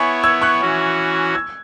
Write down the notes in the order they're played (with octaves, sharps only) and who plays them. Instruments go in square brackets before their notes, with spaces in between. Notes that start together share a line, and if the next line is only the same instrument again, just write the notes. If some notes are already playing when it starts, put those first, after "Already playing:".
Already playing: [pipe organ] B3 E4 C#5 [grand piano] G#5 C#6
[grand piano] E6 G#6
C#6 F#6
[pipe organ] E3 C#4 F#4
[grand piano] E6 G#6